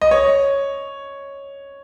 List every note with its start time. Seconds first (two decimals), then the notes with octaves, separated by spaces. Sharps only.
0.01 D#5
0.11 C#5